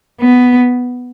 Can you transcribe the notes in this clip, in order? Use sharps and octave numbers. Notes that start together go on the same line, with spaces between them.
B3